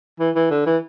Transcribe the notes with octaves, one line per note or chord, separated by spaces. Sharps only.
E3
E3
D3
E3